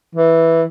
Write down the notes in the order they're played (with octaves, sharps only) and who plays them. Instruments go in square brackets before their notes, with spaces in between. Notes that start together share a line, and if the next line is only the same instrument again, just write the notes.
[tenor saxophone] E3